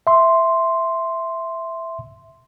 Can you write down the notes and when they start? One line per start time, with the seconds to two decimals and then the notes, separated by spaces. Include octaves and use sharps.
0.07 E5 C6